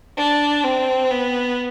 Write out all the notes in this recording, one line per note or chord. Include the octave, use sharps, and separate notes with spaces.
D4
C4
B3